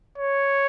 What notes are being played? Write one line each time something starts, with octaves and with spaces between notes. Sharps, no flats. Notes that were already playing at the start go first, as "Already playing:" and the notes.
C#5